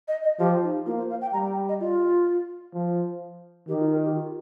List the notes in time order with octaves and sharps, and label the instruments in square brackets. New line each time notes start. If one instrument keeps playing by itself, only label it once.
[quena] D#5
D#5
[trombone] F3 [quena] G4
[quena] D#4
[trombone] A#3 [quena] F4
[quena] C5
F5
G5
[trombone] G3 [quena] A#5
[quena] G5
D#5
F4
[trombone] F3
[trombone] D#3 [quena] G4
[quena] F4
A#4
G4
F4